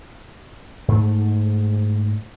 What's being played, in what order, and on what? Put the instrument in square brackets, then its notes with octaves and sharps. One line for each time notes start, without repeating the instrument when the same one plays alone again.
[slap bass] G#2 A3